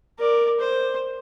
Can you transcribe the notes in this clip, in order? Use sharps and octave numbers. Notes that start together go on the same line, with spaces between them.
A#4 D5
C5